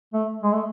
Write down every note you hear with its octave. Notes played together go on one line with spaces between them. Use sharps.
A3
G#3
A3